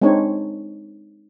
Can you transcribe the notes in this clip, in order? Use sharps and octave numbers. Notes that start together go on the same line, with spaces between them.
G#3 C4 D4 D#4 C#5